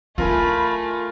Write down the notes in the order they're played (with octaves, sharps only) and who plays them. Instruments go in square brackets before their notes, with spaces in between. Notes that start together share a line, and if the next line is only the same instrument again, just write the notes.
[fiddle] A3 [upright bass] E4 [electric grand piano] F4 A#4 G#5 [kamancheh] B5